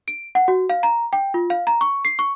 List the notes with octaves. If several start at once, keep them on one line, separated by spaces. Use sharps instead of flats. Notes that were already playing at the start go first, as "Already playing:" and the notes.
D7
F#5
F#4
F5
A#5
G5
F4
F5
A#5
C#6
C7
C#6